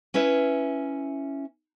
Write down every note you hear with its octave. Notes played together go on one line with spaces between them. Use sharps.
C#4 E4 B4 E5